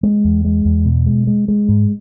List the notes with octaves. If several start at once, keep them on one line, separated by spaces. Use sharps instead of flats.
G#3
E2
G#3
E2
B2
G#3
G#3
G#3
G#2